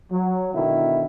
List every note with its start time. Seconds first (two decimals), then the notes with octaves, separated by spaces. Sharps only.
0.11 F#3
0.54 B2 D3 D#3 E4